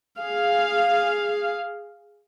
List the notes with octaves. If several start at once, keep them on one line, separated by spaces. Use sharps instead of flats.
G#4 F5